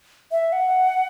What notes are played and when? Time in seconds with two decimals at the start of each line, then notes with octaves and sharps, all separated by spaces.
0.32 E5
0.53 F#5